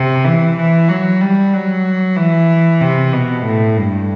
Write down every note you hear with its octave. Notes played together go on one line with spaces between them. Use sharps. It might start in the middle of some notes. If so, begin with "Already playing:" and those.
Already playing: C3
E3
E3
F#3
G3
F#3
E3
C3
B2
A2
G2